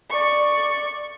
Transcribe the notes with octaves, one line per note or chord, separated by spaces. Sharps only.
D5 C#6